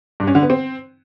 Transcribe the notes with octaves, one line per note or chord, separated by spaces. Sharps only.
G2
C#4
D3
B3
C4